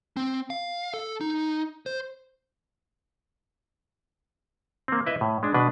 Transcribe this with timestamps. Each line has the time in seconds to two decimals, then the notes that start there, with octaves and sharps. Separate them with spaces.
0.17 C4
0.50 F5
0.94 A4
1.21 D#4
1.86 C5
4.88 A#3 C4
5.06 E4 B4 D#5 E5
5.21 A2
5.43 G#3 D4
5.54 B2 D4 B4